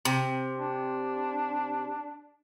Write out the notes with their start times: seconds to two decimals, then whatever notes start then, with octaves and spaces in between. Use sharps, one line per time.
0.05 C3
0.59 D4